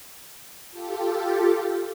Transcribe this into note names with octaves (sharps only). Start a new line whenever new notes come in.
F4 G4 A4